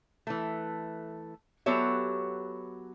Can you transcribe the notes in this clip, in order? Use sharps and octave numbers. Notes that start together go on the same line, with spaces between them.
E3 A3
F#3 B3 G4 A4 C#5 E5